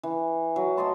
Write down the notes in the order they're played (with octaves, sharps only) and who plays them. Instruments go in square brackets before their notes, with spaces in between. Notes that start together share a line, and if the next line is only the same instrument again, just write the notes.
[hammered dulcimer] E3
F#3
A3 D#5 A5 C6